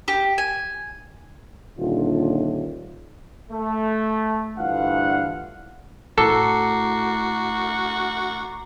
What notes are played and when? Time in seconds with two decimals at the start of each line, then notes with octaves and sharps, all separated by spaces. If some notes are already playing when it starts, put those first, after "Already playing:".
0.08 G4
0.38 G#5
1.78 D#1 D#2 D3 F4
3.51 A3
4.58 D2 G2 E3 F4 F5 F#5
6.18 A2 F#4 A4 A#5 D6 C7